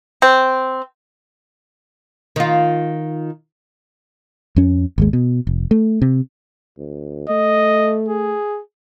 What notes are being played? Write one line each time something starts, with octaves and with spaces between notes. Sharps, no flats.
C4
D#3 F4
F2 C#4
G#1 D#2 G#3
B2
F1
A3
C3
D2
A3 D#5
G#4